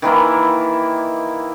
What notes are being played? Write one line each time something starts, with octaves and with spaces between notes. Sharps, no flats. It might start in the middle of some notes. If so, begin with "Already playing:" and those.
D#3 E3 A#3 E4